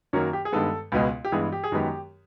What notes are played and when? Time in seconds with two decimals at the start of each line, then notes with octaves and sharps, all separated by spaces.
0.13 F#2 D#3 F#3 A#3 C#4
0.33 G4
0.45 G#4
0.52 G2 D#3 G#3 B3 A4
0.92 C#2 B2 G#3 B3
1.25 G4
1.32 G2 E3 G#3 B3 G#4
1.52 G4
1.64 G#4
1.72 F#2 D#3 G#3 B3 G4